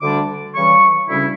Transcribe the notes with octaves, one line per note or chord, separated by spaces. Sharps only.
D2 D3 G3 D4 D6
C#3 E3 G3 C#6
D2 C#3 G3 C#4 E4